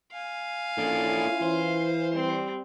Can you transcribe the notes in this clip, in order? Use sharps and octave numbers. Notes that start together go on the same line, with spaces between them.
F5 G#5
A#3 C#4 D4 E4 F4 A4
E3 C5
G3 C4